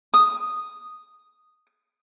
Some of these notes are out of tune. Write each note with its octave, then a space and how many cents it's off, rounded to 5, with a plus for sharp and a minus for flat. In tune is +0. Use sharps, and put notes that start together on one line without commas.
D#6 -5